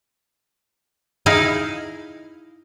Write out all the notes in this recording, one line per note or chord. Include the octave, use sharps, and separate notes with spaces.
D#4 E4 G#4 F5